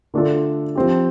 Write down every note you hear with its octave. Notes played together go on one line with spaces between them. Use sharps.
D3 A3 D4 F4 A4
F3 C4 G4